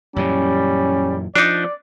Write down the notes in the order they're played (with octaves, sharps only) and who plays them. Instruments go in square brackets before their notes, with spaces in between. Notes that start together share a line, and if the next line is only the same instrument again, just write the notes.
[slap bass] F#2 A#2 E3 [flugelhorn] G3 [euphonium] C#4
[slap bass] F3 [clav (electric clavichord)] D4 D#4 [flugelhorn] D5